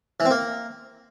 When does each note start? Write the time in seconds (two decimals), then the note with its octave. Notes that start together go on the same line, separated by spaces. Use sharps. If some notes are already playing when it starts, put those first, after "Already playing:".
0.20 E3
0.25 C4
0.31 A#3